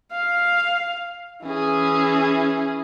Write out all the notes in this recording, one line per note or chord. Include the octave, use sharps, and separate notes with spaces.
F5
E3 C#4 G#4